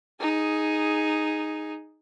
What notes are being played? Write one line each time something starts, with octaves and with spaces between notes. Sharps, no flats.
D#4 G#4